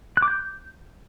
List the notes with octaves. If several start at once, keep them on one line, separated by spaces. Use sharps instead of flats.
F#6
D6
G6